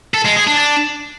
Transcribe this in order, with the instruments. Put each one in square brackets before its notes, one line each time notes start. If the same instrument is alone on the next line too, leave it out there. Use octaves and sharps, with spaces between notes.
[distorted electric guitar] A4
G#3
G#4
D4
D4